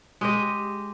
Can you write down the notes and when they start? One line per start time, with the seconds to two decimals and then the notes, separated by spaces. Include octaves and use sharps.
0.21 G#3 G4 D#5